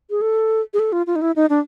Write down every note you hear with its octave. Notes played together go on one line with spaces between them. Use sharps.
G#4
A4
G#4
A4
F4
F4
D#4
E4
D#4
D4